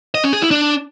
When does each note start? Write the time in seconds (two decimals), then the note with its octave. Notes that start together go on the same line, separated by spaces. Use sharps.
0.15 D#5
0.24 C#4
0.33 G#4
0.42 E4
0.51 D4